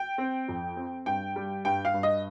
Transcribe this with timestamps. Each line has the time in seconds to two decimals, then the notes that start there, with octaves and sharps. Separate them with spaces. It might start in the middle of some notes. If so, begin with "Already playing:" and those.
Already playing: G5
0.18 C4
0.48 F2
0.76 C4
1.06 G2 G5
1.36 G3
1.65 G2 G5
1.85 F5
1.94 G2
2.03 D#5